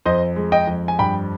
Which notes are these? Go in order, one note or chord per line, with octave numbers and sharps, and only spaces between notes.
F2 C5 D#5
G#3
D#5 G5
F2
G#5
G2 G5 B5